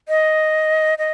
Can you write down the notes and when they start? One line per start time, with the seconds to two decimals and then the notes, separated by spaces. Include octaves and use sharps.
0.09 D#5
0.98 D#5